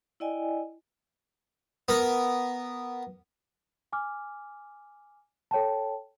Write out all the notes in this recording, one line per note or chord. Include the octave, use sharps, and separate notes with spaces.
E4 D5 D#5 G5 G#5
B3 A#4
G#5 D6 F6
A4 C#5 G5 A5